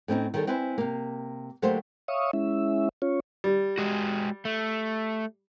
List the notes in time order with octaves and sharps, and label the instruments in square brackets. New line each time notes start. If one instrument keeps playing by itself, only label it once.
[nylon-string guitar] A2 C4 C#4 D#4
D#3 G3 B3 G#4 A4 C#5
C4 E4 B4 C5 G#5
C3 A#3
D3 F#3 A3 A#3 G4 C5
[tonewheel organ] C#5 E5 F5 C#6 D#6
G#3 C#4 E4 E5
C#4 F4 C#5
[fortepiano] G3
[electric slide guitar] G#3 F#4
A3